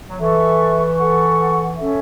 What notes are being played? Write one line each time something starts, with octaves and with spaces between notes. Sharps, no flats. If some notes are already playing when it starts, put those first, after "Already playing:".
F#3
E3 A4 E5 C#6
A4 F#5 C#6
C#4 A4 E5